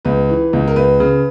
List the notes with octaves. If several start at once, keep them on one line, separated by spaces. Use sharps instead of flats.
C#2 B4
E3
C#2
A#4
C#2 B4
C#3